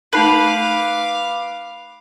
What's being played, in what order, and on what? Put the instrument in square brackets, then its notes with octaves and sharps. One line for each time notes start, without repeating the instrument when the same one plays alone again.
[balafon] A3 D#4 A5 [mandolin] B4 [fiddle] F5 D6